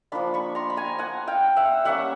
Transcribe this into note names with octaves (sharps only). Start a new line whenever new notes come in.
F3 A#3 D4 A5 B5
B5 C#6
A#5 C6
B5
G#5 A#5
F#5 G#5
F5 G5
E5 F#5
G3 A#3 C#4 E5 F#5